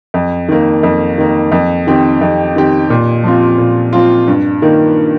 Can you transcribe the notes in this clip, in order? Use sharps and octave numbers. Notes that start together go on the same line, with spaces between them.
F2
D#3 A#3
F2
D#3 A#3
F2
D#3 C4 G4
F2
D#3 C4 G4
A#2
F3 C4 F4
A#2
F3 C4 F4
G2
D#3 A#3